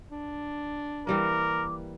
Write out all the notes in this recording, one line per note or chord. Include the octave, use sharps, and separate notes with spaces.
D4
E3 G3 A#3 A#4 D6